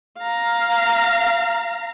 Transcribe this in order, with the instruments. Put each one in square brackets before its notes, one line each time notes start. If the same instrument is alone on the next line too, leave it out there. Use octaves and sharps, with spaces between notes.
[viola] F5 A#5